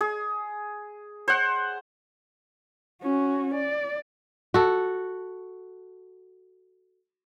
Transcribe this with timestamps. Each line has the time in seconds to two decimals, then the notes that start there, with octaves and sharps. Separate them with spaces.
0.01 G#4
1.28 C5 F#5
3.03 C#4 F#4
3.54 D5
4.54 F#4 A4